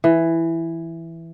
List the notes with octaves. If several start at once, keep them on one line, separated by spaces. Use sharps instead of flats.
E3